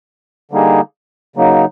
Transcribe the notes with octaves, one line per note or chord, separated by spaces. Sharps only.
D3 G3 A#3 D#4 G#4
C#3 F#3 A#3 D#4